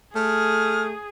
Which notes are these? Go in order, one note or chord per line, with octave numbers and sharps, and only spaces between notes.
A3 G#4 F6